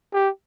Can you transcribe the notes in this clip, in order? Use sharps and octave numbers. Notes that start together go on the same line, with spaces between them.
G4